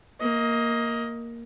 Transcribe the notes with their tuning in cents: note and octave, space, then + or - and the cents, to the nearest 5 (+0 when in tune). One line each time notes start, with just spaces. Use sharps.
A#3 +0 D#5 +20